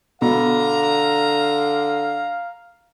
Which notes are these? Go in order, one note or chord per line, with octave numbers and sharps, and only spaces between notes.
B2 D3 F5 A#5